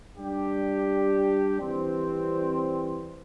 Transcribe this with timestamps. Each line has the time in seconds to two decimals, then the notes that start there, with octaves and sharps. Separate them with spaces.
0.17 G3 D4 G4
1.59 E3 G3 C4